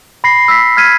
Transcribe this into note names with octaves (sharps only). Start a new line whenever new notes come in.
B5 A#6 C7
E6 B6
F6 G#6 B6 D#7